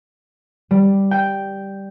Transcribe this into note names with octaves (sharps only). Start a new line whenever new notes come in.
G3
G5